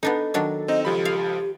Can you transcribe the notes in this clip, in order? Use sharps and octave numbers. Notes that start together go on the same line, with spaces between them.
B3 D4 D#4 A4
D#3 F#3 D4
C4 D#4 D#5
C#2 F3 G4 B5
F5